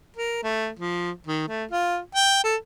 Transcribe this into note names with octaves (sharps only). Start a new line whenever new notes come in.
A#4
A3
F3
D#3
A3
F4
G5
A4